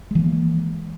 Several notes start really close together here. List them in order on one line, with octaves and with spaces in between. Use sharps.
G#3 E3 A#3